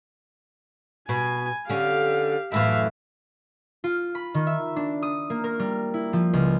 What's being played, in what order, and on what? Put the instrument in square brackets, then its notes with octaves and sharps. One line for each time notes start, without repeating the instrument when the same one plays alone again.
[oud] B2 [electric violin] G#5
[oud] D3 C#4 [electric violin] G4 F5
[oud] F#2 A2 E3 [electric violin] E5 F5
[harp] F4
B5
D#3
E5
D4
D#6
A#3
A#4
G3
E4
F3
C#2